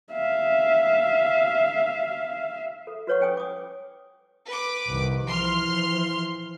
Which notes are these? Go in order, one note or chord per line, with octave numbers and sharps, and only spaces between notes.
E5 F5
A4
F#4 B4 C#5 F#5 C#6
C#4 G5 G#5 D#6
D6 D#6
B4 D6
C2 D#3
E3 F3 C6 F6